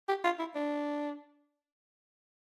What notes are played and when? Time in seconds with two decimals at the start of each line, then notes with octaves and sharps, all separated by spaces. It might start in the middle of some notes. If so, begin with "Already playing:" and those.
0.08 G4
0.24 F4
0.39 E4
0.55 D4